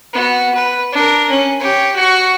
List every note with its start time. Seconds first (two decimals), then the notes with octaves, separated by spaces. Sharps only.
0.13 B3 F#4
0.55 B4
0.93 D4 A#4
1.30 C#4
1.60 G4 C#5
1.96 F#4 C#6